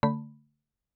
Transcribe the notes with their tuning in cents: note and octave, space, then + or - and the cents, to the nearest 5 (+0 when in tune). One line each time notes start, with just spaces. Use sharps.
D3 -30 A3 +20 B5 +0